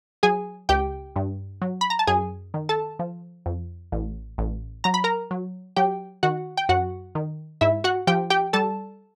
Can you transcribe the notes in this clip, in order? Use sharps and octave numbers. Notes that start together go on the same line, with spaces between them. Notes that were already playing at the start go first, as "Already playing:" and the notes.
F#3 G#4 G#5
C#2 G4 G5
G2
F#3
B5
A#5
A5
F#2 G#4 G#5
D#3
A4 A5
F3
F2
A1
A1
F#3 A#5
B5
A#4 A#5
F#3
F#3 G4 G5
D#3 F#4 F#5
G5
F#2 F#4 F#5
D#3
G#2 E4 E5
F#4 F#5
F3 G4 G5
G4 G5
G3 A4 A5